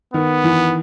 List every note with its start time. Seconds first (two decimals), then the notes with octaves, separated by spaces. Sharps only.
0.14 D#3 B3
0.44 E3